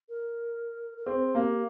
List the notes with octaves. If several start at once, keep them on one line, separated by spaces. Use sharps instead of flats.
A#4
A#4
C4 G#4
A#3 G4